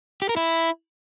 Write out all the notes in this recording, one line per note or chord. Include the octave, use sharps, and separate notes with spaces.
G4
A#4
E4